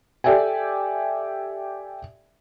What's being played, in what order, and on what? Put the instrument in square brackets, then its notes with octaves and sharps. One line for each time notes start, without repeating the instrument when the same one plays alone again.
[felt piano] G4 A4 D5 E5 G5 G#5